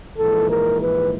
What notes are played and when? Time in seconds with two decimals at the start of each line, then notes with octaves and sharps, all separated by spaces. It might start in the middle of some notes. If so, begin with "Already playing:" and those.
0.18 A#1 G#2 E3 A4
0.50 A#4
0.81 B4